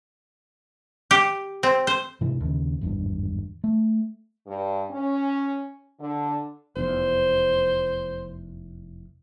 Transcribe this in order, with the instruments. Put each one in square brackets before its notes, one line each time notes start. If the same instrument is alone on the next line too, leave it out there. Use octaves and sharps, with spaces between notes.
[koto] G4
C4
C5
[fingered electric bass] G#2 C3 E3
D#2 C#3
G#1 E2 G2
A3
[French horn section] G2
C#4
D3
[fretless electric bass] F1 E2 [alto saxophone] C5